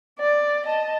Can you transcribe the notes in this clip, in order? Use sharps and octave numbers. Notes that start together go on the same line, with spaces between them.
D5
D#5 A5